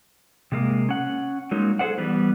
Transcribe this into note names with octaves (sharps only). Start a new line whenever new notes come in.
C3 G#3 A#3
C#4 F#5
F#3 G#3 A#3 C#4 D#4
G#4 A4 C5 D5 F#5
E3 G3 B3